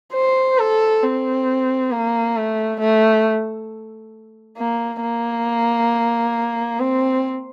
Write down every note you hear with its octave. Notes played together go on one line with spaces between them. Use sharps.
C5
A4
C4
A#3
A3
A3
A#3
A#3
C4